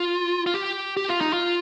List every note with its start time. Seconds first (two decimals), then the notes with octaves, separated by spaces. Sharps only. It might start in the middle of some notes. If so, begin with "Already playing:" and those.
Already playing: F4
0.46 F4
0.54 G4
0.97 G4
1.09 F4
1.21 D#4
1.33 F4